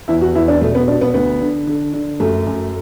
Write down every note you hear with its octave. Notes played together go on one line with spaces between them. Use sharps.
E2 E4
F#4
E2 E4
D4
B2 A3
B3
B2 D4
B3
D2 B3
D3
D3
D3
F#2 A3
F#2